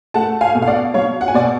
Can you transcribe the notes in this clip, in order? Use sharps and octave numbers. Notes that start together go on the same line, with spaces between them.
A3 F#5 A5
F5 G#5
B2
F5
D5 F#5
F#3 C#5 F5
F#5
G#5
B2 D5 F#5